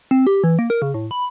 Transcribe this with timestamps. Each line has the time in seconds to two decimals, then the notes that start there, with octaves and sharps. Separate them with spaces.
0.11 C4
0.27 G4
0.44 E3
0.59 A#3
0.70 A#4
0.82 C#3
0.94 A2
1.11 B5